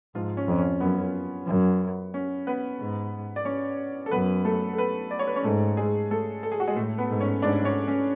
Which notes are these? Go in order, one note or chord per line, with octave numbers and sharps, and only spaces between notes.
G#2 F3 F4
C#4
F2
C#4
F#2 B3
F#2
C#4
B3 B4
G#2
D5
C#4 C#5
A4
F#2 B3 B4
A3 A4
A4
B3 B4
D5
C#5
B4
C#4 C#5
G#2 A3 A4
G#3 G#4
A3 A4
A4
G#4
F#4
G#3 G#4
A2 A3 A4
B3 B4
G#2
C#4 C#5
G#2 D4 D5
C#4 C#5
C#4 C#5